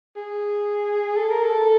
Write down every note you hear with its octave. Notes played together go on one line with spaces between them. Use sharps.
G#4
A4
A#4
A4